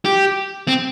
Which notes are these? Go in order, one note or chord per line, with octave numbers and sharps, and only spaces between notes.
G4
C4